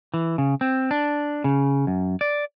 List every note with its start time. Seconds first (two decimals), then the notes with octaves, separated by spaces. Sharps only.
0.14 E3
0.38 C#3
0.61 C4
0.91 D4
1.44 C#3
1.87 F#2
2.21 D5